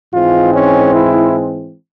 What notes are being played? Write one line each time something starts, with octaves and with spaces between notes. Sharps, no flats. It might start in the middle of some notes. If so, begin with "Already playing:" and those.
G#2 E3 G#3 C4 F4
C#4
E4